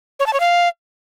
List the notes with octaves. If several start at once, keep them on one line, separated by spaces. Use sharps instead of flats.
C#5
A5
C#5
F5